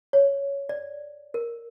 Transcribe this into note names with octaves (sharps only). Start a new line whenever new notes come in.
C#5
D5
A#4